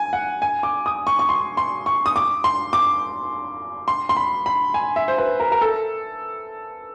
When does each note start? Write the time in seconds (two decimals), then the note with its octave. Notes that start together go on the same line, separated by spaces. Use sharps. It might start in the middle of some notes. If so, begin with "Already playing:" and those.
Already playing: G#5
0.13 F#5
0.42 G#5
0.63 D6
0.86 D#6
1.07 C#6
1.19 C#6
1.29 C6
1.57 C6
1.86 C#6
2.06 D#6
2.16 D6
2.44 C6
2.73 D6
3.88 C6
4.09 C6
4.17 B5
4.46 B5
4.74 G#5
4.96 E5
5.08 C5
5.18 B4
5.40 A#4
5.52 A#4
5.61 A4